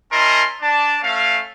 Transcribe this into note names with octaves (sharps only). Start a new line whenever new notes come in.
C#4 E4 A#4 D#5 A5 C6
D4 A5
A3 C#4 F5